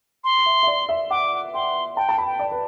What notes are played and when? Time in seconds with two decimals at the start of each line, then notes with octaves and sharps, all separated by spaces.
0.24 C6
0.46 E5
0.63 E5
0.67 D5
0.89 E5
1.10 F#5 D6
1.54 G5 C6
1.97 G5 A5
2.09 A5
2.18 B5
2.26 G5
2.39 D5
2.51 B4